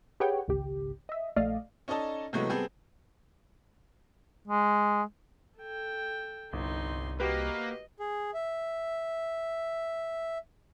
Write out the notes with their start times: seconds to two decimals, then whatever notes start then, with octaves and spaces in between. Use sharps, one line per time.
0.20 G4 G#4 B4 C#5 F#5 G5
0.48 G#1 C#2 G4
1.09 D#5 E5
1.36 A#1 A3 D5 D#5 F5
1.88 C#4 D#4 A4 D5 D#5 A5
2.33 C3 E3 F#3 G#3 A3 B3
2.49 G3 B3 C4 G#4 A4
4.48 G#3
5.59 A4 G5
6.53 G1 C2 D#4 C6
7.20 A#3 F#4 G4 B4 D#5
8.00 G#4
8.34 E5